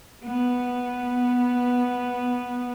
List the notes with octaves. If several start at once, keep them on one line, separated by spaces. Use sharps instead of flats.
B3